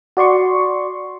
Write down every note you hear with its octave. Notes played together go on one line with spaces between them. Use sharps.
F#4 D5 C6 C#6